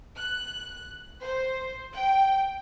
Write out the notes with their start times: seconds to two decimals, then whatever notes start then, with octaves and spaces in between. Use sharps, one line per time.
0.16 F#6
1.22 C5
1.94 G5